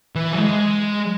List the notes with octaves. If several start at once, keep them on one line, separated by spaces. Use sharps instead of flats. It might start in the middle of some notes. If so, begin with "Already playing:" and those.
E3
F#3
G#3